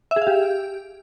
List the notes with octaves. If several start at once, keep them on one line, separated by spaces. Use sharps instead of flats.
E5
G#4
F5
G4